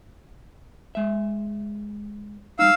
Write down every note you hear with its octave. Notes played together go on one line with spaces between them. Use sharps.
G#3 E5
G3 A3 D#4 F5 E6